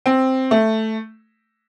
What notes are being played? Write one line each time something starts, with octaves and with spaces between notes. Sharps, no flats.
C4
A3